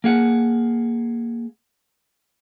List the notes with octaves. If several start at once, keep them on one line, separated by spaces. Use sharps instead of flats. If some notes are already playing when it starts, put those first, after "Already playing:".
A#3 G#4 F#5